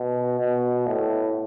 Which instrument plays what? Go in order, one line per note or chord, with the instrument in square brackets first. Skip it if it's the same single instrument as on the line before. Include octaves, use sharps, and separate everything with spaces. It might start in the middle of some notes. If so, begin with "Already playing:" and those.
Already playing: [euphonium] B2
B2
A2